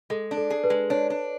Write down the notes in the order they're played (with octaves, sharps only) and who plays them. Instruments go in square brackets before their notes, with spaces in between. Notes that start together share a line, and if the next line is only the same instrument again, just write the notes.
[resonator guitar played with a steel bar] G#3 [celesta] A4
[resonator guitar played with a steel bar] D4
[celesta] A4
[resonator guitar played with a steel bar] G#4
[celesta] B4
[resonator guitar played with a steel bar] G#3
[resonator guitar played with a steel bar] D4 [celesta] C#5
[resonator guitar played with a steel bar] D4